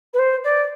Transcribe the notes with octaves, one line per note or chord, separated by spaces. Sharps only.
B4
C5
D5